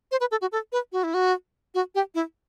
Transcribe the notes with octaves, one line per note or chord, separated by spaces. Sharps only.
C5
B4
A4
F#4
A4
B4
F#4
E4
F#4
F#4
G4
E4